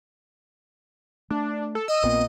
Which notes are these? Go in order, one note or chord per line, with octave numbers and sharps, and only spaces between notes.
A3 D4
A4
D#5 E6
A#1 A#2 B3 C4